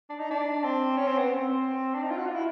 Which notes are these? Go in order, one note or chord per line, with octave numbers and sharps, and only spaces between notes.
D4
D#4
D4
C4
C#4
C4
B3
C4
D4
D#4
F4
F#4
F4
E4